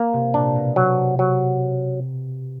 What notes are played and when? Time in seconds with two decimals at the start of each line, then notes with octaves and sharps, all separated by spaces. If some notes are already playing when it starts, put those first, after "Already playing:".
Already playing: A#3
0.13 C3
0.34 A#2 D4
0.56 B2
0.76 C3 F#3
1.19 F#3